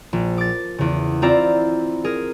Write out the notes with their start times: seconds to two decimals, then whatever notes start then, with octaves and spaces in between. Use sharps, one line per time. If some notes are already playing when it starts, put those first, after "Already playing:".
0.13 A#1
0.38 D6 A6
0.78 E2 C#3
1.22 C4 E4 F4 D5 A#5 D6
2.04 G#4 A#4